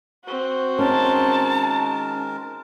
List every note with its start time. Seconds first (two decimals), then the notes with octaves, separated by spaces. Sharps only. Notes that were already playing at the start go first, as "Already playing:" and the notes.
0.24 C4 F#4
0.79 D#3 G#3 C#4 A#4 A5